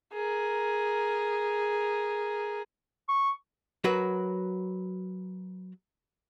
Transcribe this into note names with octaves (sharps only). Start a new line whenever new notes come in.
G#4 A#4
C#6
F#3 F#4 A#4 B4